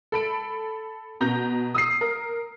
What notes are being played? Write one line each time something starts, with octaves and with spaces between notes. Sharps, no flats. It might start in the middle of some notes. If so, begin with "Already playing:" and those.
A4 B5 D7
B2 A#5 G6
D#6 E6 C7
A#4